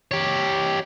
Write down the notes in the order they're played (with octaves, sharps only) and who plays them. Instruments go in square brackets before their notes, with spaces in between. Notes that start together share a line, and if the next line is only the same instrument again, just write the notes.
[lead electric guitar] G4 C#5